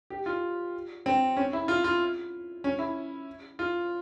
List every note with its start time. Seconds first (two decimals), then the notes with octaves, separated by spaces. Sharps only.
0.10 G4
0.26 F4
1.06 C4
1.37 C#4
1.53 E4
1.68 F4
1.84 F4
2.64 C#4
2.79 E4
3.59 F4